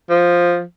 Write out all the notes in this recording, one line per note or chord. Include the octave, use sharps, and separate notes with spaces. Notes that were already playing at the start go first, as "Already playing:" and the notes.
F3